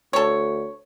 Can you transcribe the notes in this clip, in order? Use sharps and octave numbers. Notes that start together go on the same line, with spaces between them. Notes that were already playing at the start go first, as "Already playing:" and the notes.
D2 A4 C#5